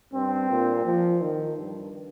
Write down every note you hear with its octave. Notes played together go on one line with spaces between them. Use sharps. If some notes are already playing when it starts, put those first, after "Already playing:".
G2 C4
A#2
F3
D#3
G2